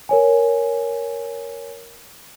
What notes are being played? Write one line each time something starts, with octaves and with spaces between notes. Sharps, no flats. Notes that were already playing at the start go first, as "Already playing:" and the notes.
A#4 C#5 G#5